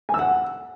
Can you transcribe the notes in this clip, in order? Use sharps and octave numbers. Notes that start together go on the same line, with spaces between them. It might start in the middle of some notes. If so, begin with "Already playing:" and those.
G#5
E6
F#5